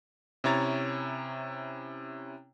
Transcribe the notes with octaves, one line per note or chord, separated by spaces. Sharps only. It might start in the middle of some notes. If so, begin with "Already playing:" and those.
C3 C#4 E4 C#5 A#5 A6